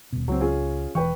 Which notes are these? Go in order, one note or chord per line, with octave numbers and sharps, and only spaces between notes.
D#1 B2
C#2 F#3 C4
C#4 F4 G#4
E1 B1 E3 B4 G5 C#6